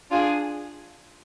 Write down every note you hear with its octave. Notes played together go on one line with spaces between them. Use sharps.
D4 F4 G#4